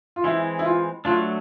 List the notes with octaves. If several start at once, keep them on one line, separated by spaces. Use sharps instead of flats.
F4
E3 G#3 C4 E4
E4
F4
F#3 A3 D4 F4